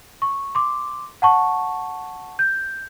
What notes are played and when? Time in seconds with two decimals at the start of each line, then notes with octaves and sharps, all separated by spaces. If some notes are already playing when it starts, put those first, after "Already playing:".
0.22 C#6
0.55 C6 D6
1.22 F#5 A5 C#6
2.39 G6